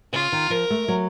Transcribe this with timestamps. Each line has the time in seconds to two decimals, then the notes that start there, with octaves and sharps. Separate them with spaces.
0.13 C#3 F4
0.32 D#3
0.50 F3 A#4
0.70 A3
0.88 F#3